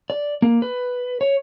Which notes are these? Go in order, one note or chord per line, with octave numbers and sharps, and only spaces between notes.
D5
A#3
B4
C#5